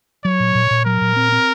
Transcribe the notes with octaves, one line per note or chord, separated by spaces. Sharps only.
F#3 C#5
A#2
A#2
A#2
F#3 A#4
A#2
C4
C4